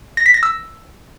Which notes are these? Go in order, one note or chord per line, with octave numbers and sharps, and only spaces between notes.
A#6
B6
A#6
E6